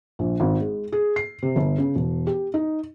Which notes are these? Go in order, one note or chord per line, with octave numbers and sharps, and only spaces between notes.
A#1
G#1
G#3
G#4
C7
C3
G1
C#3
E1
G4
D#4